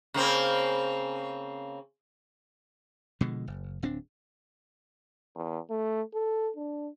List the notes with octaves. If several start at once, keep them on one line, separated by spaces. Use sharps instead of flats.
C#3 A#3 C4
B2 D3 F3 G#3
F#1
D1 C4 D4
E2
A3
A4
D4